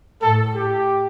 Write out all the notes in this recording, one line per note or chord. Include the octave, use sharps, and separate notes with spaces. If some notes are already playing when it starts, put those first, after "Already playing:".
A2 A4
G4